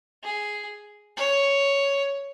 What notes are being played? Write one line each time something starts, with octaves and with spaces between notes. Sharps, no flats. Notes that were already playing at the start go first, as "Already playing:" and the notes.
G#4
C#5